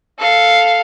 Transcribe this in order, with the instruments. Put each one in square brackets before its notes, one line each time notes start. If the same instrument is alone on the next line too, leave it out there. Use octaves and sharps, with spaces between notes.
[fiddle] A4 F5